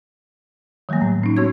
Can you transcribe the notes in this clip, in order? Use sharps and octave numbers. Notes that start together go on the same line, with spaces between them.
D#3 F#3 G3 A3 A#3
A2
C#4 D#4
B3 D4 F#4 C#5 C#6 G#6